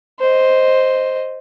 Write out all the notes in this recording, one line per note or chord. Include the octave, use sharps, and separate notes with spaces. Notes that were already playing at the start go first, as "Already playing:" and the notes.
C5 D#5